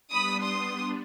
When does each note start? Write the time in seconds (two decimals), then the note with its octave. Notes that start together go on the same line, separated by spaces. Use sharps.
0.10 G3 B3 D4 B5 D#6
0.41 C6 D#6